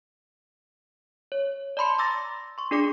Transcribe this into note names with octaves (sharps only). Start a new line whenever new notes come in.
C#5
D5 A5 B5 C6 C#7
A#5 C6 D6 E6 A6 A#6
C6 C#6
D4 F4 G#4 D5 C6 D6